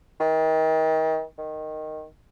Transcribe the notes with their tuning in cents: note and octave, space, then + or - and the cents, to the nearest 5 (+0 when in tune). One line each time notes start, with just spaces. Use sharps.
D#3 +35
D#3 -5